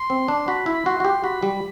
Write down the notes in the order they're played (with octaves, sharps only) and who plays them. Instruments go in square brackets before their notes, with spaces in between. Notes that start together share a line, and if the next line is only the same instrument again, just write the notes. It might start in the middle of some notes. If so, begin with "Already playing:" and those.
Already playing: [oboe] C6
[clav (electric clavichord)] C4
D4
[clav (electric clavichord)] F#4 [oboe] B5
[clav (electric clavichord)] E4
[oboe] B5
[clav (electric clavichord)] F#4 [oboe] C6
[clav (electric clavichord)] F#4
G4
[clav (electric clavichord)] F#4 [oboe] B5
[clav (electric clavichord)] G3